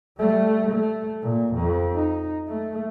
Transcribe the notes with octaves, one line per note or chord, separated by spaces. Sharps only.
G3 A3
A3
A#2
F2
D#4
A3